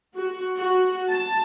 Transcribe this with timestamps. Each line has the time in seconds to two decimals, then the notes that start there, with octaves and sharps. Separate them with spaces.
0.14 F#4
0.56 F#4
1.09 A5